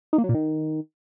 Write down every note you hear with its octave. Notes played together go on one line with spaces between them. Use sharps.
D#4
A#3
F#3
A#2
D#3